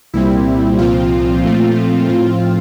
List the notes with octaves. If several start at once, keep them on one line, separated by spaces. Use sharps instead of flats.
C2 A#2 G3 C4 E4
C2 A#2 F3 C4 F4
A#2 F3 A3 C4
A2 F3 C4